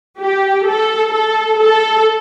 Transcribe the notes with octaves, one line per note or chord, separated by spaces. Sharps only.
G4
A4
A4
A4